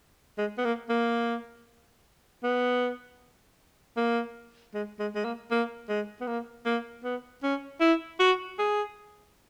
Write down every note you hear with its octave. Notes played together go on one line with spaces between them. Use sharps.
G#3
B3
A#3
A#3
B3
A#3
G#3
G#3
G#3
A#3
A#3
G#3
B3
A#3
A#3
B3
C#4
E4
F#4
G#4